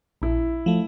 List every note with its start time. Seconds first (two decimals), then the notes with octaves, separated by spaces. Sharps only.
0.22 A#1 E4
0.66 F3 A3